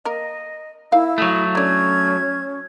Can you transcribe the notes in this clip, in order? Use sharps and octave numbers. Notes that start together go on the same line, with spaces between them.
A#3 A#4 D#5
A#3 D#4 E4 F5 E6
F#3 A3 D#6
D3 C#4 D5 G#6